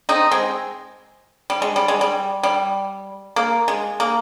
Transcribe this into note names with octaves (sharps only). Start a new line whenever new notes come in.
C4 D#4
G#3 C4
G3
G#3
G3
G#3
G3
G3
A#3
G#3
A#3